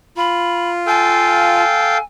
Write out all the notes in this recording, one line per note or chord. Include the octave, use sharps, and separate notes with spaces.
F4 B5
A4 F5 G5 G#5